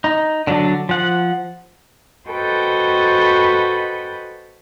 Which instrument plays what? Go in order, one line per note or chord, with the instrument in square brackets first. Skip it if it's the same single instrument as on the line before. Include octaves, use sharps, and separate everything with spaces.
[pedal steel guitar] D#4
D3 F#3 D4
F3 F#5
[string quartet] F#4 A4 B4 C5 D#5 G5